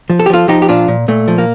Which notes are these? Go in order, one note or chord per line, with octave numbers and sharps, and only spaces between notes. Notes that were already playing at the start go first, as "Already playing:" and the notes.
F3
A4
G4
F3 F4 A4
F3 D#4 G4
G4
A#2 D4 F4
A#2
A#2 A3
F3
A#3